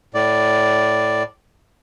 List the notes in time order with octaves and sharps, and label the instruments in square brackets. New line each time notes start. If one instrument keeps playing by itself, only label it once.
[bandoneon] A2 D5